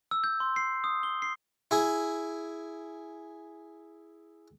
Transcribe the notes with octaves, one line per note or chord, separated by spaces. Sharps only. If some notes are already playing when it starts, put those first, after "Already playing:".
E6
G6
C6
C7
D#6
G7
C7
E4 G#4